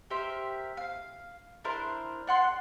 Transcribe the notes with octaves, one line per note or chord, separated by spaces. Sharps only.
G4 A#4 C5 E5
F5
D4 E4 A#4 C5
D4 F#5 C6